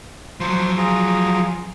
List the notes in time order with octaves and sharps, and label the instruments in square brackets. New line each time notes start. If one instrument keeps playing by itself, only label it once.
[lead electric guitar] F3 F#3 [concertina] C5 C6
[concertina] F4 G#4 A#5